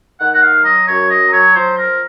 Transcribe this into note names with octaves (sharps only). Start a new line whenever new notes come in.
D#3 F#5
F#5
F5
F#3
D#5
F#2 C#5
D#5
F#3
C#5
F3 C5
A#4